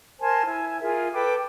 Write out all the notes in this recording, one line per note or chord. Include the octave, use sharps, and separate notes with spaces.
A#4 C5 G#5 A5
E4 G#5
F4 G#4 A#4 E5
A4 B4 G5 D6